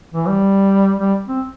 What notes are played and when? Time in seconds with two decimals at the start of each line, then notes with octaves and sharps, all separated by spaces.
0.14 E3
0.28 G3
1.00 G3
1.27 C4